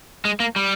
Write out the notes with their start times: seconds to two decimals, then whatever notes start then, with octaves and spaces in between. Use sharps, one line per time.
0.25 G#3
0.40 A#3
0.56 G3